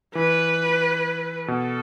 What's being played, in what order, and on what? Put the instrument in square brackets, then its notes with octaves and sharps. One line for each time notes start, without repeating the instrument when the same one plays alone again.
[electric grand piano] E3 [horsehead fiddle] B4
[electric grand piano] B2 [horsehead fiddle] A4